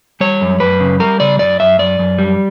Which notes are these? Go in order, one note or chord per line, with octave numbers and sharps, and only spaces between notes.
G3 C#5
F#2
F#2 B4
C#3
G3 A#4
C#3 D5
F#2 D5
F#2 E5
F#2 D5
F#2
G3